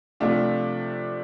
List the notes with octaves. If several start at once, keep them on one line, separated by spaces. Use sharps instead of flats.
C3 F3 A3 D4 F4